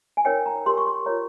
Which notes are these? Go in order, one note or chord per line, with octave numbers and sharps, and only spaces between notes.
G#5
D#4 A#4 C#5 G5
A#5
G4 A#4 C#5 C6
C#6
C6
F4 A#4 C#5 A#5